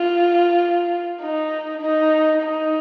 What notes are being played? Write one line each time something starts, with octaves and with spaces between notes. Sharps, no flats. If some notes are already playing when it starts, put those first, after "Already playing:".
Already playing: F4
D#4
D#4
D#4